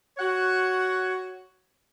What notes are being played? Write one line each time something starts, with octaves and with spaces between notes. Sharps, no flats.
F#4 C#5 F#5